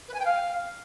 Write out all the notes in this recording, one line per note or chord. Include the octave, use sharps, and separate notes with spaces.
B4
G#5
G5
F5